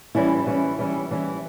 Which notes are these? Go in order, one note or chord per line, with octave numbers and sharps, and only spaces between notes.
E3 G3 C#4 E4
E3 G3 C#4 E4
E3 G3 C#4 E4
E3 G3 C#4 E4